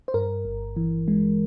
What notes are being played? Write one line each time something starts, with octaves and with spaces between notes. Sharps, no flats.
C5
G2 A#4
G1
E3
G#3